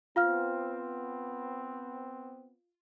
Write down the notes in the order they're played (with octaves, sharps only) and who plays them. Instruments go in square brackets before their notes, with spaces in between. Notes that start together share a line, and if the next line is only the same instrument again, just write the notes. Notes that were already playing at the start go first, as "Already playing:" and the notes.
[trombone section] B3 C4 [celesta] F4 F5 F6